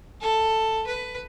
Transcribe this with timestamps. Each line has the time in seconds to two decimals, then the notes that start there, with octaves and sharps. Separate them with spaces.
0.21 A4
0.87 B4